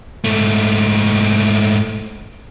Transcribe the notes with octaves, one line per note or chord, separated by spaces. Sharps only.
G#2 A3